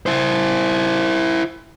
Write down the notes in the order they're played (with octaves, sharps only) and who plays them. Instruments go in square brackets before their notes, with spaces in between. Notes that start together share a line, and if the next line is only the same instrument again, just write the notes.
[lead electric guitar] E4 C5